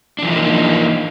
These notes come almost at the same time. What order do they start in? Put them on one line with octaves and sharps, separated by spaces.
D4 E3 F3 D#4 A#3